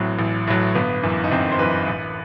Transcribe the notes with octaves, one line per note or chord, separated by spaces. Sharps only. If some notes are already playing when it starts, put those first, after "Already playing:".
Already playing: A1 A2 F#3 C4
A1
A2 F#3
G1 B3
F#2 E3
D#4
G1 C4
C5
F#2 E3 B4
A1